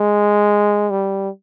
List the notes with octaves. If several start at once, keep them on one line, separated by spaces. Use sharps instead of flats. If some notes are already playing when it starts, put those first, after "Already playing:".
Already playing: G#3
G3